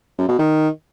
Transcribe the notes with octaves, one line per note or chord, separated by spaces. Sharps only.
F#2
B2
D#3